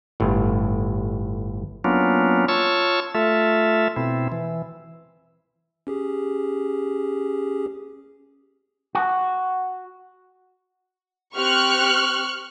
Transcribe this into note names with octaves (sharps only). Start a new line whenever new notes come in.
G1 A2
F#3 A#3 B3 C#4 D4 F4
F4 C#5 A5 C#6 E6
A3 F4 A4 E5
B2 C4 E4
E3
C#4 G4 G#4
F#4
C4 G4 C#6 F6 F#6